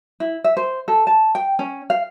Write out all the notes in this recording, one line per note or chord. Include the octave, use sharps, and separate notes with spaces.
E4
E5
C5
A4
A5
G5
C#4
F5